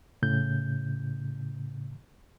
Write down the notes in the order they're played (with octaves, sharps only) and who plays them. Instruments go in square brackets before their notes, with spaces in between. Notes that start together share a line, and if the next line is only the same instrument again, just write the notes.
[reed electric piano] A2 C#3 G6